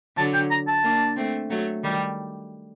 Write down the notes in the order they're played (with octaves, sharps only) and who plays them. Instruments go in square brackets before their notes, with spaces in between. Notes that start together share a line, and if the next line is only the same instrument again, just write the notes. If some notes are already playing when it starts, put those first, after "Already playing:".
[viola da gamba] D3 F#3 [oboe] A5
[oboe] G5
A#5
A5
[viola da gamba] A#3 D4
A3 C4
F#3 A3
D#3 G3